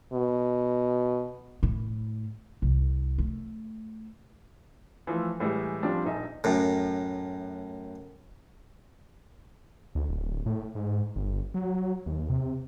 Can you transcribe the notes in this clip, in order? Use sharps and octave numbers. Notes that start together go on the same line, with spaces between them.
B2
A2
C2
A3
E3 F3 A3
A2 E3 G3 G#3
F3 G3 C4 D4
D#1 A#1 D#4 E5
F#2 A2
D2
D1
A2
G#2
G1
F#3
D#2
C3